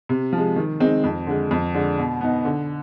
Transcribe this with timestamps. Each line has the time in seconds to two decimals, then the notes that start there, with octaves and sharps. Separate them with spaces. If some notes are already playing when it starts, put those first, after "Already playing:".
0.09 C3
0.33 F3 G#3
0.56 D#3
0.80 G#3 C4 D#4
1.04 F2
1.27 D3 G#3
1.51 F2
1.74 D3 G#3 D4
1.98 B2
2.21 B3 D#4
2.45 D3